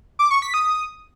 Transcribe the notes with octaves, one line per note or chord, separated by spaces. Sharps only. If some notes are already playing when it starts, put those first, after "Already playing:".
D6
C#6
B6
D#6